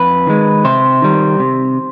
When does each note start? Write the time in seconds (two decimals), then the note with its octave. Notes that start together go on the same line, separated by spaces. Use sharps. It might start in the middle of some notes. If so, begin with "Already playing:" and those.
Already playing: F2 B4
0.27 D#3 G#3
0.65 C3 C5
1.02 D#3 G3
1.40 C3